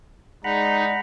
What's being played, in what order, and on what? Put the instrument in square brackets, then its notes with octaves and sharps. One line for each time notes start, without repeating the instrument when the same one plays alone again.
[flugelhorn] G#3 [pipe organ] D#4 [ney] D5 [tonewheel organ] F#5 A#5 B5